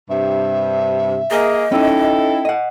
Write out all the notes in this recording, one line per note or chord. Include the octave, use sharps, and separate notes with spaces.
G2 C3 E5
A#3 G#4 D#5
C#4 D#4 E4 A4 G5
D#5 F#5